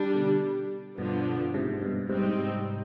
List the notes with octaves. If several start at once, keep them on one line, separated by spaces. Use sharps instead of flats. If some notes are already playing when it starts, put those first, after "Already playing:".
Already playing: G3 D4
B2 D3
G2 B2 D3 F3 B3 D4
G#2 C3
G2 B2
G#2 C3 G3 C4 D#4